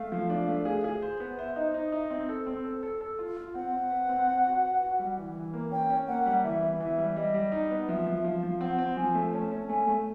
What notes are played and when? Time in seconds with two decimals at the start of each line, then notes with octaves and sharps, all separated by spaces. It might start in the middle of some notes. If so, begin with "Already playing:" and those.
Already playing: A3 F5
0.12 F3
0.30 D4
0.48 A3
0.65 G#4
0.84 G#4
1.02 C5
1.20 B3
1.38 C5 E5
1.56 D#4 D#5
1.74 D#4
1.92 D#4 E5
2.10 C4
2.29 A4
2.47 C4
2.65 A4
2.83 A4
3.01 A4
3.19 F4
3.36 F4
3.55 C4 F#5
3.73 C4
3.91 B4
4.09 C4
4.27 C4
4.46 F#4
4.64 B4
4.81 F#4
4.99 G3
5.17 E3
5.36 E3
5.54 A#3
5.71 C#4 G5
5.90 C#4
6.08 A#3 F#5
6.26 G3
6.44 E3 E5
6.62 B3
6.80 E3 E5
6.98 G3
7.16 G3 D#5
7.34 G3
7.52 D#4
7.71 B3
7.89 F3 E5
8.07 F3
8.24 F3 F5
8.43 F3
8.61 C4 F#5
8.79 C4
8.97 F3 G#5
9.15 A3
9.33 C#4 A5
9.52 C#4
9.69 A3 G#5
9.87 A3